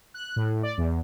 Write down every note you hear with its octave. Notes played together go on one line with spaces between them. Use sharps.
F#6
A2
D5
E2